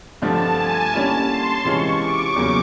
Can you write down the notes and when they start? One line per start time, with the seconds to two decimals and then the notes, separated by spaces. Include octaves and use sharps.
0.22 G2 D3 F3 A3 A5
0.58 G#5
0.94 D3 G3 A#3 C#4 E4 A5
1.29 C6
1.65 C3 E3 G#3 C#4 F4 C#6
2.00 D6
2.36 E2 C#3 F#3 A#3